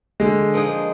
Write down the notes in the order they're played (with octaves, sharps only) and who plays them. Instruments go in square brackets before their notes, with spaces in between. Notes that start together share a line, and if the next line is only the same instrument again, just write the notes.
[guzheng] D3 [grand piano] G#3
[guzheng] F3 A#3 D#4 G#4